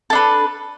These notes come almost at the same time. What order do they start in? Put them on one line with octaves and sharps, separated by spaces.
A4 D4 B4